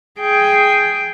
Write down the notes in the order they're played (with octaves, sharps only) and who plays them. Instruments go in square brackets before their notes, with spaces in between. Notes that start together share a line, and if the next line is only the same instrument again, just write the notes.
[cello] G#4 G5